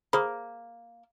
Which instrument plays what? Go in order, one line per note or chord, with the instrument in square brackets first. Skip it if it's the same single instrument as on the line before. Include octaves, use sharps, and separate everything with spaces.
[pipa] A#3 [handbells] G#4 C5 B5